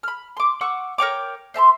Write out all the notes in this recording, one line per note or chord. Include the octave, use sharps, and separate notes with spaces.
B5 F6
C6 D6
F#5 C#6 D6 E6
A#4 C#5 G5 D6
C5 E5 A5 C6